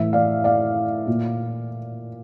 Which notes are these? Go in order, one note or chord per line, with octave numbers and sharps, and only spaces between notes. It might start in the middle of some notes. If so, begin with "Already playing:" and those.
Already playing: A2 E3 E5
D5 F5
D5 F5
A#2